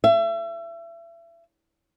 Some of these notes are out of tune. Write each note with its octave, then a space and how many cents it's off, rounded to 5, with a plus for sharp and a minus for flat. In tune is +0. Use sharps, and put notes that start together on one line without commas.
E5 +35